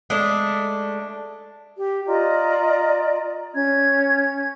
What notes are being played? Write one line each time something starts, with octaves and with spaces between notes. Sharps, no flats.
G#3 A3 D4
G4
F4 D5 D#5 A#5
C#4 G#6